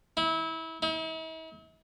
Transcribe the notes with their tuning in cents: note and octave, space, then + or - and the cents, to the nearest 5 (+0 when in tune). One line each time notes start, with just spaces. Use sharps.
E4 -25
E4 -45